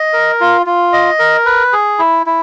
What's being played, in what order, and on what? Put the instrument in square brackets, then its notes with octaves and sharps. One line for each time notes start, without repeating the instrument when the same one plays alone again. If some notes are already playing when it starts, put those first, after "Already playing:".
Already playing: [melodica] D#5
A#4
F4
F4
D#5
A#4
B4
G#4
E4
E4